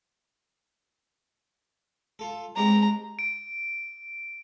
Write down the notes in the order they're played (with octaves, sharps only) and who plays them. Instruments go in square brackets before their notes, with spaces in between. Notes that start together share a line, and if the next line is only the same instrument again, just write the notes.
[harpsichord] F4 A4
[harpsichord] G#3 C4 G4 [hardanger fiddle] A#5
[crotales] D7